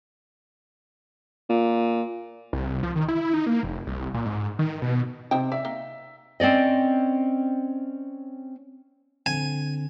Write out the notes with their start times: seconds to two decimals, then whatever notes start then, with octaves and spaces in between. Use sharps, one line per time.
1.50 A#2
2.53 C2
2.83 F3
2.96 D#3
3.08 E4
3.34 D#4
3.46 A#3
3.63 F1
3.87 C2
4.14 A#2
4.26 G#2
4.59 D#3
4.82 B2
5.31 C3 D#4 C5 G5
5.52 D5 E5
5.65 A#3 D#4
6.40 C4 C#4 D5 D#5
9.26 D3 C4 G#5